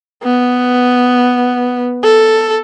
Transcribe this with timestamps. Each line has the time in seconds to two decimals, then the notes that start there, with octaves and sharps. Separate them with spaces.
0.23 B3
2.03 A4